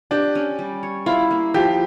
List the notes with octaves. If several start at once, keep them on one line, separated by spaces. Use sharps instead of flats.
D4 G4
C#4
G3
C#5
E4 F4
A#3
F3 G4